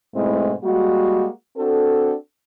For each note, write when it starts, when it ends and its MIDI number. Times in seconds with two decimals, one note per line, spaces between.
0.15 0.53 44
0.15 0.53 47
0.15 0.53 56
0.15 0.53 57
0.15 0.53 60
0.15 0.53 64
0.63 1.28 55
0.63 1.28 56
0.63 1.28 58
0.63 1.28 66
1.57 2.13 60
1.57 2.13 62
1.57 2.13 66
1.57 2.13 69